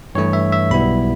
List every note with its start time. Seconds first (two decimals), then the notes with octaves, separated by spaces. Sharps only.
0.15 G2 E3 A3 E4 C#5
0.33 E5
0.52 E5
0.71 B1 B2 G3 B3 E4 B5